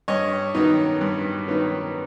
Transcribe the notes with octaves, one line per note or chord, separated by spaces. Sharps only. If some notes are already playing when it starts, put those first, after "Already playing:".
G2 C#5 D#5
D#3 F#3 B3 D#4
G2
D#3 F#3 B3 D#4